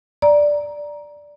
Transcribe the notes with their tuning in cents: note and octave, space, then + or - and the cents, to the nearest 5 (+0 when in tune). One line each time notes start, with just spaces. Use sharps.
D5 +0 A#5 +15